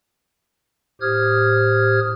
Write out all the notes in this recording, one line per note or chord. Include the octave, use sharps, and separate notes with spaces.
A2 G4 C5 D#6 F6 G#6